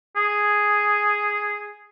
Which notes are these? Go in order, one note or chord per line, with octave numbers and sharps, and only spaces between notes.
G#4